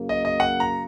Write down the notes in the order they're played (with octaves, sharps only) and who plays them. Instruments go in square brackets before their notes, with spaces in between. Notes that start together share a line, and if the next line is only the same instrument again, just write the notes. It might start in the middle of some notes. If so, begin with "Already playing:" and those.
Already playing: [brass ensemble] F#2 C#3 A#3
[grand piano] D#5
D#5
F#5
A#5